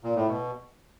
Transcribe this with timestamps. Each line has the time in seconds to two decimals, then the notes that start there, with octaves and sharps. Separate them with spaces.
0.04 A#2
0.16 A2
0.28 B2